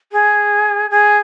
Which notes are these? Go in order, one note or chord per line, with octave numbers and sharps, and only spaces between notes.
G#4
G#4